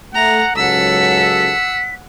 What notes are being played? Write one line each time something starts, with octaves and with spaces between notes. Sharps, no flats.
A3 F#5 A#5
C#2 G#2 F#3 A4 F#5 E6 B6